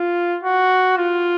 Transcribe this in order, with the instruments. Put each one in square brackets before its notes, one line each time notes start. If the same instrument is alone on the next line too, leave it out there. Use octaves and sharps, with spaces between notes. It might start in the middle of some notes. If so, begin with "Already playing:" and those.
Already playing: [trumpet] F4
F#4
F4